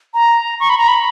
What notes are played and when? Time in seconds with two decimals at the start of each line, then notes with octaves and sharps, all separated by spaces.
0.14 A#5
0.60 C#6
0.70 B5
0.78 A#5
0.88 B5